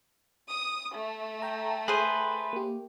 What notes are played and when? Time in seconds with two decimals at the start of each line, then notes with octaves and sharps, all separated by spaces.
0.50 D#6
0.95 A3
1.42 G5 A5 A#5
1.88 G#4 B4 C5
2.53 A#3 G4